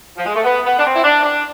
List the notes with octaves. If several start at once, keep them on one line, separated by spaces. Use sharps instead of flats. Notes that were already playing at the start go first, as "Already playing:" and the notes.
F3
G#3
A3
B3
B3
D4
C4
E4
D4
D4